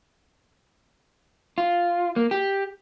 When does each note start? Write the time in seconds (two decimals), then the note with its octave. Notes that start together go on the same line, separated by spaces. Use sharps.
1.58 F4
2.16 A#3
2.31 G4